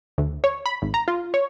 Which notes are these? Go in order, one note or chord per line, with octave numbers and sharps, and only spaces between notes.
D2
C#5
B5
G#1
A#5
F4
C#5